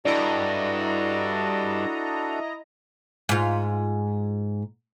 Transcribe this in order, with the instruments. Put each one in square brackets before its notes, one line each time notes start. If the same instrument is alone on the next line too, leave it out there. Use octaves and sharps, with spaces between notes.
[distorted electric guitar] G2 [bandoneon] D4 F#4 A4 [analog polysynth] E4 D#5 A#5 [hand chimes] D5
[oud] G#2 F4